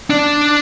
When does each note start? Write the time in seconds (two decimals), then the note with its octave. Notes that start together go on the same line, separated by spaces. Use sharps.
0.10 D4